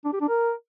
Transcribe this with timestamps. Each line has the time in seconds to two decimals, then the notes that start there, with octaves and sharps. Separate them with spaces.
0.05 D4
0.13 G4
0.21 D4
0.29 A#4